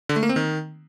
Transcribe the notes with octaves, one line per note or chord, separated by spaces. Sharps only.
D3
A3
A#3
C4
D#3